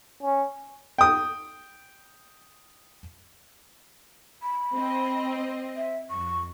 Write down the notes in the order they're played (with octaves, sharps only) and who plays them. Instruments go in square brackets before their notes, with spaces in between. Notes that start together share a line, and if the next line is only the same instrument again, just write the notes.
[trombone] C#4
[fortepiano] G5 D#6
[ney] B5
[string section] C4 D#5
[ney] E5
[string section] F2 [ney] C#6